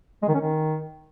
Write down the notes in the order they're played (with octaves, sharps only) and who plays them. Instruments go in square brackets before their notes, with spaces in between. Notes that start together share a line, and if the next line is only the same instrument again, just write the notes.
[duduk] G#3
D#3
C#4
D#3